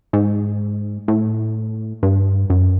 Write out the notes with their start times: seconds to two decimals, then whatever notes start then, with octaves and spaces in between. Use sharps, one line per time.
0.13 G#2
1.08 A2
2.03 G2
2.50 F#2